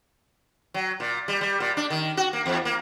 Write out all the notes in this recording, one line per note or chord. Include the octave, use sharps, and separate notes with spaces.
F#3
A#2
G3
G3
A#2
D4
D#3
F#4
A#3
E2
A#3